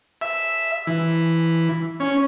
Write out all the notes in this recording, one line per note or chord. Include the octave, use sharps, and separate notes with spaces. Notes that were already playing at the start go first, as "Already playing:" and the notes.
E5
E3
C#4